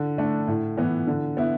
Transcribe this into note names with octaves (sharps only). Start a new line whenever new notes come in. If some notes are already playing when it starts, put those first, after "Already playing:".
Already playing: D3
A3 D4
A2
E3 B3
D3
B3 E4